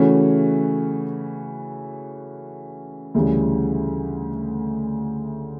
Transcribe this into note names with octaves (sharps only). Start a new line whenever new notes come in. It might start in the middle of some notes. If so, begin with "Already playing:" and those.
Already playing: C#3 E3 A3 C#4 F#4
D2 C#3 E3 G3